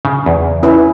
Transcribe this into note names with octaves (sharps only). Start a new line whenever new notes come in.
C#3
E2
C#4 E4 B4